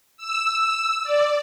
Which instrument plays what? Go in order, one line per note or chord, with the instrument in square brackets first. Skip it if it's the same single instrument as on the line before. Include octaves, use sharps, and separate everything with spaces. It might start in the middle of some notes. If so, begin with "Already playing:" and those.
[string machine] E6
D5